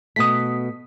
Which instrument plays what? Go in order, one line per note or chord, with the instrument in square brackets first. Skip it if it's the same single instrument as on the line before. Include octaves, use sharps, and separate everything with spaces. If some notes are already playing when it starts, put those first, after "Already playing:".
[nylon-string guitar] B2 A3 [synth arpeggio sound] D#6 B6